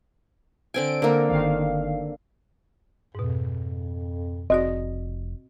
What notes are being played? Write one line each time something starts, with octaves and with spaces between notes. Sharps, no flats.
D3 C4 G#5 D7
D3 A#3 A#4
G1 D#3 F5
F2 G#2 B2
F1 C4 F#4 D5 D#5